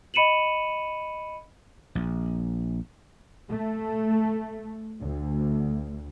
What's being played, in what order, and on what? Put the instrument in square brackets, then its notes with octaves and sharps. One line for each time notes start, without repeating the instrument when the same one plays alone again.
[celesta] D#5 B5 C#7 D#7 E7 F#7
[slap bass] A#1
[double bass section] A3
D2